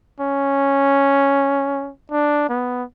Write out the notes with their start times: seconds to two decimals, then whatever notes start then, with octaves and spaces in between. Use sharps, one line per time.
0.20 C#4
2.11 D4
2.49 B3